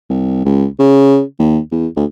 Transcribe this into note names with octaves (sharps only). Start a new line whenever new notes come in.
C2
C#2
C#3
D#2
E2
D2